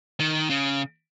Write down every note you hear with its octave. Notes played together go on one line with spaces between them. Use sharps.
D#3
C#3